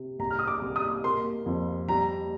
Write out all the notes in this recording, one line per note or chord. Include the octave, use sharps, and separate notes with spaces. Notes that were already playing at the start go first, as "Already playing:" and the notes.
Already playing: C3
C2 A#5
F6
D#6
D6
C2
D#6
A#3 C6
F2
G3 A#5